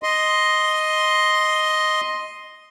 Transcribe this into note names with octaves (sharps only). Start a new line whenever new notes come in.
D#5 C6